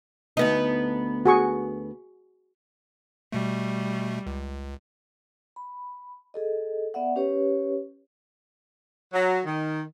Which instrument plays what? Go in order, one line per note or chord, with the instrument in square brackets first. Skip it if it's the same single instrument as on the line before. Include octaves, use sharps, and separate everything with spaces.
[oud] D2 B3 D#4
[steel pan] F#4 G#4 C#6
[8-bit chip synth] B2 A3 [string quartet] G3
[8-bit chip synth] C#2
[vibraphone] B5
G#4 A4 D#5
B3 D5 E5 F#5
C#4 G4 B4 C#5
[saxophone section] F#3
D#3